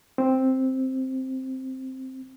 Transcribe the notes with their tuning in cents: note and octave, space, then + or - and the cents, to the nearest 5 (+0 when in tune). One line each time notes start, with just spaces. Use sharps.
C4 +0